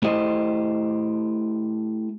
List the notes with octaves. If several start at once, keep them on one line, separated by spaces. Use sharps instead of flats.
A3 E4 G4 C5 D#5